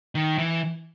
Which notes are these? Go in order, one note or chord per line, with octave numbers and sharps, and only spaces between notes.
D#3
E3